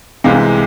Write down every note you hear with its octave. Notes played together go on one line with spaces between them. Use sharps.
C2 C3 E3 G#3 F5